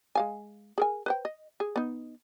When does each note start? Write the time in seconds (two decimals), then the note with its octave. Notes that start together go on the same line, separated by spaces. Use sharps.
0.15 G#3 F5 G#5
0.78 G#4 A#4 G#5
1.06 B4 C5 G5
1.25 D#5
1.60 G#4
1.76 B3 D#4